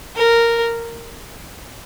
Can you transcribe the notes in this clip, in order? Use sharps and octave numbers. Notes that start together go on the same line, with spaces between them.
A#4